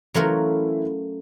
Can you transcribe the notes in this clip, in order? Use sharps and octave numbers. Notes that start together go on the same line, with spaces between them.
E3 F#3 A3 C#4 E4 F4 A#4